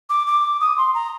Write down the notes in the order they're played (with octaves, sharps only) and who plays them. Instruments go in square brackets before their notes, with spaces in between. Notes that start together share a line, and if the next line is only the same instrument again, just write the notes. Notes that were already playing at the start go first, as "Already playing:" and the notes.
[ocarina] D6
D6
D#6
C6
A#5